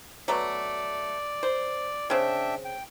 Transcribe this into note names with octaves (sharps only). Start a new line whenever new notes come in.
F#3 A3 B3 D5
C5
C#3 C4 D4 E5 G5
G5